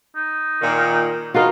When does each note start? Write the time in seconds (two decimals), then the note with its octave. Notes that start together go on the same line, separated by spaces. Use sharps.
0.16 D#4
0.62 A#2 D#3
1.34 E3 D#4 F4 F#4 A#4